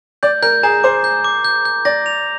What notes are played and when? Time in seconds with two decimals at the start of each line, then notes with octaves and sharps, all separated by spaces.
0.23 D5 G6
0.43 A#4 G6
0.63 G#4 A#5
0.84 C5 D6
1.04 G6
1.24 D6
1.45 G6
1.65 G6
1.85 D5 A#6
2.06 F7